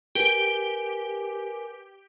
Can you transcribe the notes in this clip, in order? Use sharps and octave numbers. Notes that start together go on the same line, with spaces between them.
G4 A#4 B4 G#5